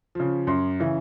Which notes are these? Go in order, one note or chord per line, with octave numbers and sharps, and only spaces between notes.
C#3 F3
F#2 C6
C#3 E3